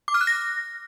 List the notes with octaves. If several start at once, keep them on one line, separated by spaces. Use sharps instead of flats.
D6
F6
F#6
A#6